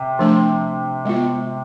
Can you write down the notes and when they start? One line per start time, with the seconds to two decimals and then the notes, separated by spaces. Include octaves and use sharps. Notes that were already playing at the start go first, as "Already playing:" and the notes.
Already playing: C3
0.19 F3 A3 D4
1.05 G#3 B3 F4